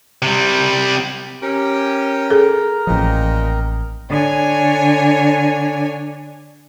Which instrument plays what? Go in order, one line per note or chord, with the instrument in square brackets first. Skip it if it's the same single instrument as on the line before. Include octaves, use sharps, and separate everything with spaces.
[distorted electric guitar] C3 G3
[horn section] C#4 G4 [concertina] A#4
[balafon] G#4 A4
[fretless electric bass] A1 F3 [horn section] A#2 D#5 G5
[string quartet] D3 C#5 G#5